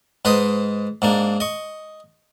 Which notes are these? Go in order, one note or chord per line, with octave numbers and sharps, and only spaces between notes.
G#2 B4 C5 D#5 D#6
G#2 A#3 D4
D#5 C#6